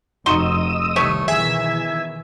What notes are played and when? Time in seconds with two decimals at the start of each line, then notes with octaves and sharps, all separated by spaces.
0.26 F1 D#4 F#4 D#5 C6 D#6 E6
0.96 C2 D#3 G3 A3 G4 C#5
1.28 B2 D#3 E3 G#4 E5 G#5